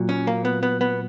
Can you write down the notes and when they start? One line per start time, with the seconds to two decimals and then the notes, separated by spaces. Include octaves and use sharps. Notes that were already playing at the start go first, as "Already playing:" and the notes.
Already playing: A#2 F#3
0.09 C#4
0.27 A#3
0.45 B3
0.63 B3
0.81 B3